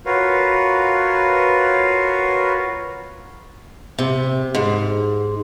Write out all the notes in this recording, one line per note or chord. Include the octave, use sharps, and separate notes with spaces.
F4 F#4 A#4 B4 C#5 F5
C3
G#2